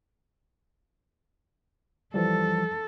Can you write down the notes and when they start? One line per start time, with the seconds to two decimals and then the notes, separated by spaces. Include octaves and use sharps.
2.14 E3 F3 G3 A4